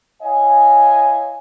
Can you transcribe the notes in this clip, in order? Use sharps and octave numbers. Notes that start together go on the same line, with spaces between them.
E4 C#5 D#5 F5 G#5